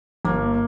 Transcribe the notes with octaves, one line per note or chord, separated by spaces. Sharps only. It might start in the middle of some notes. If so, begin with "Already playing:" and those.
G1 A#3